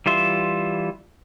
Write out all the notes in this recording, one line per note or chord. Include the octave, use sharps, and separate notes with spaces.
E3 G3 F4 E5 C6